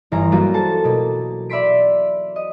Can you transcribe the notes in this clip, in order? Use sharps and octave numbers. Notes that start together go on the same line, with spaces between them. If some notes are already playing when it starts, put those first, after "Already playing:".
G1 E3 C#4 A#5 C6 A#6
F#3 G3 A#3 F4 F#4
A4 C5 A5
B2 A#3
D5 E5 B5 C6 B6 D7
D#5